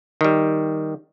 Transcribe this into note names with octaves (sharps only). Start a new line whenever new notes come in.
D#3 G3